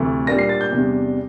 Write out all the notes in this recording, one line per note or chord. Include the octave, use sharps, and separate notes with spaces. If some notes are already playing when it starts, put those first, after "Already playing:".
Already playing: D2 C3 E3 A3
A#2 G3 A#3 D4 A#6
C7
A6
G6
E2 C3 G3 D4